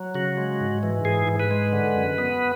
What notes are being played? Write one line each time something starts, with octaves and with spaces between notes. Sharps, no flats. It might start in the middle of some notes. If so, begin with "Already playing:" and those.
Already playing: F#3
C#3 F#4
G#3
G#2
E3
G#2 G#4
G#2
B4
G#3
D3
F#2
B3